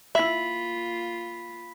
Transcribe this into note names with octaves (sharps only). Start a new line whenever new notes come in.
A#3 E4 F4 E5 B5 B6